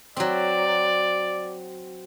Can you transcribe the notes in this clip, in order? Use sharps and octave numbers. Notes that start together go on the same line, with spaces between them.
F#3 C4 D5